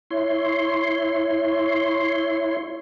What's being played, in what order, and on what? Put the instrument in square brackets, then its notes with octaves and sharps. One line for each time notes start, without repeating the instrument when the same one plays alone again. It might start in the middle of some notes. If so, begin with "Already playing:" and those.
[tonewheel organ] E4 C#5 C6